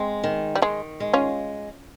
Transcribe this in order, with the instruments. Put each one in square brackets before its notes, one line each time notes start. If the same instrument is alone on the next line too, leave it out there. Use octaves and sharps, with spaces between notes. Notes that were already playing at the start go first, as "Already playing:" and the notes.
Already playing: [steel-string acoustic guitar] G#3 [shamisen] C4
[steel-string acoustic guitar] D#3
[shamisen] G3
[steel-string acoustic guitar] D#3 [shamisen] G#3
[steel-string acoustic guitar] G#3
[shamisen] C#4 F4